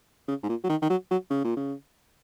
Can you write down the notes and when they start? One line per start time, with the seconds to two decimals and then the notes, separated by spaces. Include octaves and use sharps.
0.28 C#3
0.43 G#2
0.49 A#2
0.64 F#3
0.69 D#3
0.82 D#3
0.90 F#3
1.11 F#3
1.31 C#3
1.44 A#2
1.57 C#3